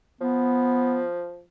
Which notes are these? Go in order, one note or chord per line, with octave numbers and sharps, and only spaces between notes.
F3 B3